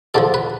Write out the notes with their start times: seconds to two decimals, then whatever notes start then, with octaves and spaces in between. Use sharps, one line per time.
0.14 E2 D3 F3 A4
0.34 B4